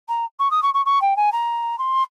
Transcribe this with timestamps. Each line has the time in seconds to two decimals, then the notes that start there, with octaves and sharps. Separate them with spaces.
0.08 A#5
0.39 C#6
0.51 D#6
0.62 C#6
0.74 C#6
0.85 C#6
1.01 G5
1.16 G#5
1.32 A#5
1.78 C6